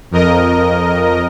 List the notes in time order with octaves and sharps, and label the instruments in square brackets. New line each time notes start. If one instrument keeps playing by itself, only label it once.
[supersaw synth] F2 A#4 D#5